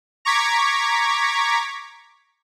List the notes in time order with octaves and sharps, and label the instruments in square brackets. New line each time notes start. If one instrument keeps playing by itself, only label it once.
[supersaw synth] A#5 C#6 D6 G#6 B6